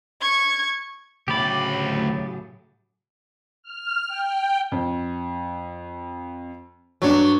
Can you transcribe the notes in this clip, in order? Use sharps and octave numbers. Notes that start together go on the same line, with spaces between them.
C#6 G#6
D2 A2 C#3 F#3 G4 D5 B5
F6
G5
F2
G2 F#3 D4